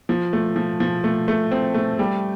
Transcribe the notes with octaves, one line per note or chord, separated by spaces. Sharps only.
F3
A3
F3
F3
A3
A3
C4
A3
G3